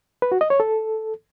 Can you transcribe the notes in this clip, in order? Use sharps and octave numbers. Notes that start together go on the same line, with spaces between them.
B4
F#4
D#5
C#5
A4